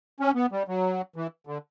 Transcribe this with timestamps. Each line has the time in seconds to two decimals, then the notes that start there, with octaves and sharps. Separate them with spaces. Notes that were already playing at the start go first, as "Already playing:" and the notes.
0.20 C#4
0.35 B3
0.52 G3
0.68 F#3
1.16 E3
1.47 D3